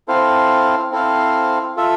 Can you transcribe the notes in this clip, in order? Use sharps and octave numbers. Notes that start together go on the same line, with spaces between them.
C4 E4 A4 C5 F5
C4 E4 A4 C5 F5
F4 A4 E5